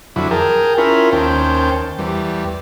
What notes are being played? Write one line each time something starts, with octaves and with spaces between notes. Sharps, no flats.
F2 D3 F#3 E4
G#4 A#4 G5 A5
C#4 E4 F4 A#4 B5
D#2 C#4 C5 G5 A5
E2 G3